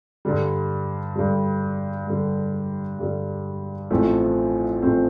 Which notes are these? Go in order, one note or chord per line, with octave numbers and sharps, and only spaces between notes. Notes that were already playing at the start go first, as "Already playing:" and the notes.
G2 D3 G3
G2 D3 G3
G2 D3 G3
G2 D3 G3
A1 A2 F3 A3 C4
A1 A2 F3 A3 C4